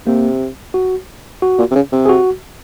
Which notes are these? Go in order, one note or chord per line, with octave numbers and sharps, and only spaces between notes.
C3 A#3
F#4
F#4
A#2
C3
C#3
C3
G#4
F#4